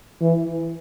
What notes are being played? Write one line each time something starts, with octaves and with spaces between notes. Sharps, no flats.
E3